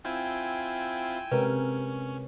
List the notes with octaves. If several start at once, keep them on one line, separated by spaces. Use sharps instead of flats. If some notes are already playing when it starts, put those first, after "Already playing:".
C4 E4 F4 G5 G#5 E6
C3 G#3 C#4 A#4 B4